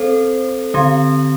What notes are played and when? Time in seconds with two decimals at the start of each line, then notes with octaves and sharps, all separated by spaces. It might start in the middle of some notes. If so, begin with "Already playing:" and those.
Already playing: C4 A4 C5
0.74 D3 C4 G4